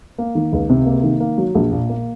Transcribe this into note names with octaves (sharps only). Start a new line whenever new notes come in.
A#3
D#3
C#2
C3
A#3
D#3
A#3
F#3
A#1
A#2
A#3